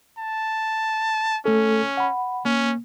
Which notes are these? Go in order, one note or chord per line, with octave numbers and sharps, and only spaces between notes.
A5
A3 C#4 A4
F#5 B5
A#3 C#4